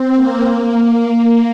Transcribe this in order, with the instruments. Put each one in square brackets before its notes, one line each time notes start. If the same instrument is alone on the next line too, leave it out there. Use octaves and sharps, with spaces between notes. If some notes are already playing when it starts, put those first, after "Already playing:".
Already playing: [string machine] C4
A#3
A#3